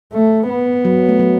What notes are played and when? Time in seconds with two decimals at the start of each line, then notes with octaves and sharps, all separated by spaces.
0.13 A3
0.49 B3
0.85 F#3
1.09 A3
1.19 F#3